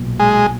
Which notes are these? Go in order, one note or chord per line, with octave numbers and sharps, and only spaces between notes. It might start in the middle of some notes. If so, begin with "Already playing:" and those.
Already playing: B1 A#2 F#3 B3
G#3